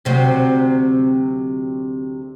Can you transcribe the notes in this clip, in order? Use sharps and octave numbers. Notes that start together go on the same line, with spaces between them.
D2 C3 F#3